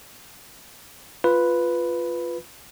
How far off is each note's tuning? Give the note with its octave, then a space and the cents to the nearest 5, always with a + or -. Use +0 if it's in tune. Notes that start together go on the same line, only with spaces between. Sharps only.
F4 +0 B4 +0